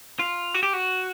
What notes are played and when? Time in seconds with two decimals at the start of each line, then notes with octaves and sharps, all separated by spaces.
0.19 F4
0.54 F#4
0.63 G4
0.73 F#4